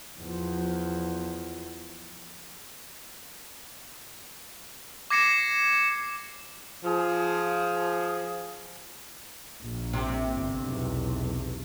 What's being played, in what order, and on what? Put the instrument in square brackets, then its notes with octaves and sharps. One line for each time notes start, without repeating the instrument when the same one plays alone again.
[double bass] E2 F3
[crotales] D6 G#6 A#6 C7 C#7 E7
[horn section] F3 G#4
[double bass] A#1
[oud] C3
[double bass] G1 G2
B1 E2